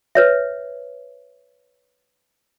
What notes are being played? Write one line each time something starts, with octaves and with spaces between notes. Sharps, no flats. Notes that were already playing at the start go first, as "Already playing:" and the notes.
B4 C#5 E5